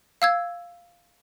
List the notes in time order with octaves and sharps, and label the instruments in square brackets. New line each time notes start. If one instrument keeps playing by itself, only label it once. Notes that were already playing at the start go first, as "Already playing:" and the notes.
[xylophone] F5 E6 G#6